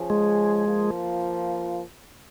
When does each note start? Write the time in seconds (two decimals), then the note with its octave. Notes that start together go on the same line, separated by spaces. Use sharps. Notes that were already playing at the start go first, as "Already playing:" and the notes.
Already playing: F3 C#4 G#4
0.10 G#3
0.68 F3 A#3 F4